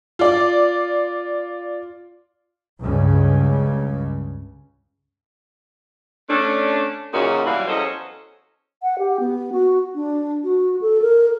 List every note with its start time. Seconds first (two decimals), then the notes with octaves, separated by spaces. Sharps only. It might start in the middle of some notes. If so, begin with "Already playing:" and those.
0.19 F4 D5
2.81 C#2 G2 C#3
6.29 A3 C#4 D4
7.13 F#2 A#2 C#3 C#4 D#4 F#4
7.46 B2 E3 F#3 G3 E4 F5
7.68 E2 F#3 C#4 A4 C5 D#5
8.83 F#5
8.98 G4
9.20 B3
9.52 F#4
9.94 D4
10.44 F#4
10.81 A4
11.02 A#4